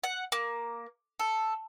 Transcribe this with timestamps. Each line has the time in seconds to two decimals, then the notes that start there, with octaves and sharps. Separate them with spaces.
0.04 F#5
0.32 A#3
1.19 A4